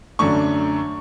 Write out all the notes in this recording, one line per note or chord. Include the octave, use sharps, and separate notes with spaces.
F#2 D3 A3 D4 C#6